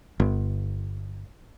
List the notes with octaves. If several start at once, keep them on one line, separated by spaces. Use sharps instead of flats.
G1